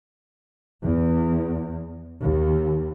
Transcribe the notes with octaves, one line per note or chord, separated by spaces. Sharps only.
E2
D#2